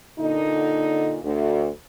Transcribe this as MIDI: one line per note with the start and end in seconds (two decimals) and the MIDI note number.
0.19 1.18 46
0.19 1.18 50
0.19 1.18 63
1.23 1.67 38